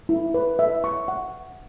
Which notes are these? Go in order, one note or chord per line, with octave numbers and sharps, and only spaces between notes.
E4
B4
E5
C#6
F#5